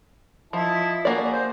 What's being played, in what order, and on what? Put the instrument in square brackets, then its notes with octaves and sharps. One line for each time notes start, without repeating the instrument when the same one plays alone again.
[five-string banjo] F3 [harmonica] E4 D#5 A5
[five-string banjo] A#3 D5 [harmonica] F#4 G#4
[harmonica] C5